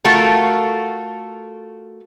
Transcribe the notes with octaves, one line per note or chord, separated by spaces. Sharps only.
A3 F4 F#4 A4 A#4